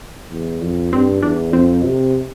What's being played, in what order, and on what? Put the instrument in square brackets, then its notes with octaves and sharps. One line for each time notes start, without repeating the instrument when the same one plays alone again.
[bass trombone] E2
F2
[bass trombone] G2 [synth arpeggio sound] C4
[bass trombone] E2 [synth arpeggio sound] D4
[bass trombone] F2 [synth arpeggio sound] C4
[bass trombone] C3